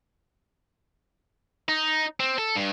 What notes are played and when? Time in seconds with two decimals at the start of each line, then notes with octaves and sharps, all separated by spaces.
1.68 D#4
2.20 C4
2.38 A4
2.55 G2